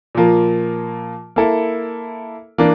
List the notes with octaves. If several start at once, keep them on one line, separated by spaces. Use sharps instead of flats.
A#2 F3 A#3
A#3 E4 A4
E3 A#3 D4